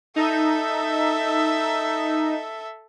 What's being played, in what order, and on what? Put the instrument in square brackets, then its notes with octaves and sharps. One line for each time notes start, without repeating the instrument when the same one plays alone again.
[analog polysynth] D#4 [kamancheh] A4 E5